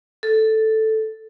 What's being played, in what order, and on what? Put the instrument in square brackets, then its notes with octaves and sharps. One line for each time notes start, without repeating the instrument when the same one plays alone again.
[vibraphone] A4